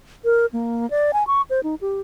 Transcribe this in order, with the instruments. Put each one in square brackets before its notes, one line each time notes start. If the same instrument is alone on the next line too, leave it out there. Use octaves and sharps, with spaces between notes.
[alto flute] A#4
A#3
D5
G#5
C#6
C5
D#4
G4